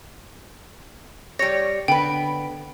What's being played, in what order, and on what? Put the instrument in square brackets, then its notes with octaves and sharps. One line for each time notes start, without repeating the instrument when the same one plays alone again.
[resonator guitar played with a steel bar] G3 C#5 [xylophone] A#6
[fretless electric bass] D3 [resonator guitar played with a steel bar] B3 B4 [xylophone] G5